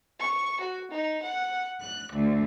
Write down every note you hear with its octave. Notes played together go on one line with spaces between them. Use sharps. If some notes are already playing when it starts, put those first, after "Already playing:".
C#6
F#4
D#4
F#5
F#6
D2